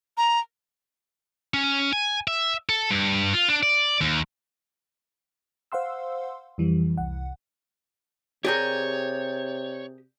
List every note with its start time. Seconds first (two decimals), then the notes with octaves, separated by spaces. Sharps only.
0.17 A#5
1.54 C#4
1.93 G#5
2.27 E5
2.69 A4
2.91 G2
3.33 F4
3.49 D4
3.63 D5
4.01 D#2
5.72 C5 F5 F#5 C6 E6
6.58 F2 E3 G3
6.98 C2 F#5
8.45 C3 G4 G#4 A#4 C#5 D5 G6